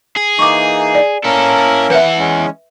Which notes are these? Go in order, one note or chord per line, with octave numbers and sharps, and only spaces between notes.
G#4
E3 A#3 D#4 C#6 D6
D5
A#3 C#4 E4 A4 A#4
E3 B4 E5 F#5
G#3 C#4